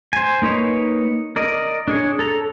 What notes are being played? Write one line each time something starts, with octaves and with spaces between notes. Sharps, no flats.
C5 G#5
A#3 D#4 B4 C#5
A#4 D5 D#5
D4 G#4 C#5
A4 A#5